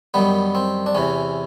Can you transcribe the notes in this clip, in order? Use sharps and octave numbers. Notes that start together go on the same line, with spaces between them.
F#2 D#3 G3 B3
C4
D4
E2 C3 E3 C#4